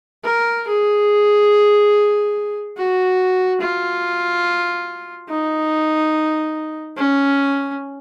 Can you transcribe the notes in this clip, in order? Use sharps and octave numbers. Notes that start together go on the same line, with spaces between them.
A#4
G#4
F#4
F4
D#4
C#4